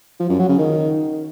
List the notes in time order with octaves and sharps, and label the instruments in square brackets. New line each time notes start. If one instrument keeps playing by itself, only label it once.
[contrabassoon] F3
F#2
F#3
C#3
D#3